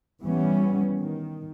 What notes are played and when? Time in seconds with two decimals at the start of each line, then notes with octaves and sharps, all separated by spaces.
0.23 E3 G3 B3 C#4
0.98 D#3